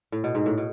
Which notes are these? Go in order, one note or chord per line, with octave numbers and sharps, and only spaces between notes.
A2
B2
G#2
A2
B2